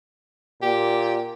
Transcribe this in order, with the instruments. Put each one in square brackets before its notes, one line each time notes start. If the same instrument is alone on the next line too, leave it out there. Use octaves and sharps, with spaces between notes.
[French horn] A#2 [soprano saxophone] G4